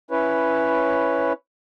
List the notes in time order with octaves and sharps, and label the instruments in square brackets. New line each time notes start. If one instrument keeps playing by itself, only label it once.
[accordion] C#4 E4 B4 C#5